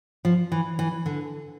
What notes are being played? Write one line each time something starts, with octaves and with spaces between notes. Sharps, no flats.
F3
E3
E3
D3